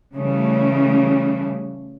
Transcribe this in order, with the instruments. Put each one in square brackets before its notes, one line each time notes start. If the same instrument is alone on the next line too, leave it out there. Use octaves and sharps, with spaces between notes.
[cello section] C#3 E3 G3 A3